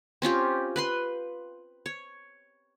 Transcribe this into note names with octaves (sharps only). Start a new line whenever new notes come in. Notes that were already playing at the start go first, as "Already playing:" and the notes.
C4 C#4 F4 G4
B4 B5 C6
C#5